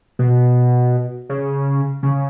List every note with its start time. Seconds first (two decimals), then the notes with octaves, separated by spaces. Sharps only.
0.19 B2
1.29 C#3
2.03 C#3